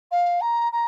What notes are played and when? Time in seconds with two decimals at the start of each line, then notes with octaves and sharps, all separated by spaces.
0.11 F5
0.41 A#5
0.72 A#5